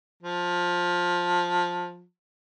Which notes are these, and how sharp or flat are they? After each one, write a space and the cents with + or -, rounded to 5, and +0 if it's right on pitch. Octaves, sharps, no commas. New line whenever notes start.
F3 +15